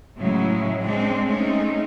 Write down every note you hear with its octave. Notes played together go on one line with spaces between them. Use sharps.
A2 C#3 F#3 G#3 E4
G#3 C4 D4
G#3 A3 C4 C#4 D#4